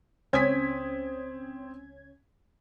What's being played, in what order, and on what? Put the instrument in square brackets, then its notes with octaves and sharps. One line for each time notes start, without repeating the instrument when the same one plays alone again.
[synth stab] C#2 C#4 G#6 [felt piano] C4 D#6 B6